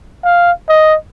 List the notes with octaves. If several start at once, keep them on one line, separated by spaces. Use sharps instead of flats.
F5
D#5